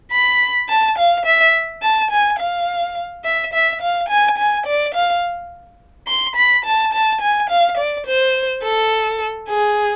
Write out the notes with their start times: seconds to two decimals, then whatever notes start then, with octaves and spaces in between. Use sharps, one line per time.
0.12 B5
0.69 A5
0.98 F5
1.25 E5
1.82 A5
2.11 G#5
2.39 F5
3.25 E5
3.53 E5
3.81 F5
4.09 G#5
4.38 G#5
4.66 D5
4.95 F5
6.07 C6
6.36 B5
6.65 A5
6.93 A5
7.21 G#5
7.50 F5
7.78 D5
8.06 C5
8.63 A4
9.48 G#4